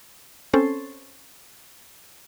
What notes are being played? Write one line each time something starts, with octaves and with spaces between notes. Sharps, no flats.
C4 C#4 A4 C5